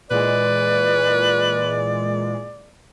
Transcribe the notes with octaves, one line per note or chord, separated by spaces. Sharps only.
A#2 E3 G#3 B4 D5